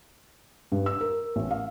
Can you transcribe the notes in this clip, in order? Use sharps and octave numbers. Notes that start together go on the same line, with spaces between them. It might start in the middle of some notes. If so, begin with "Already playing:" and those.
G2
E6
A#4
A1
F5